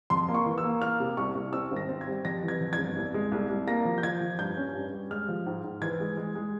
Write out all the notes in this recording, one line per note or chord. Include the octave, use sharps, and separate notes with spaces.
F2 C6
A#3
C#6
E3
E6
A#3
A#3 F6
C3
C2 C#6
C2
C4 E6
G#1
A#6
C4
G#6
G3
F2 A#6
E3
G#6
F2
G#6
G1
C2
G#3
C2
C2
A#3 A#6
F3
G6
F3 G#6
F3
G2 G6
C#4
G2
G3
G#3 F6
F3
G#2
G#2
E3 G#6
G#3
G#3
G#3